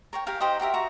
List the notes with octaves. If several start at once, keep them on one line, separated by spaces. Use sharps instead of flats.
A#4 C#5 G5
G4 A#4 F5 G#5
D#4 G4 C5 D#5
F#4 G4 A#4 E5
F#4 E5 A#5